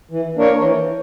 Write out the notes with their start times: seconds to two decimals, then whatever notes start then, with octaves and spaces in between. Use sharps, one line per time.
0.11 E3
0.37 A#3 D4 A#4 C#5
0.62 E3 C#5